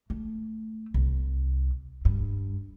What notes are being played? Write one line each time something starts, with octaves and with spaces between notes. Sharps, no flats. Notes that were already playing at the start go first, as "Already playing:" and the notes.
A3
C2
G2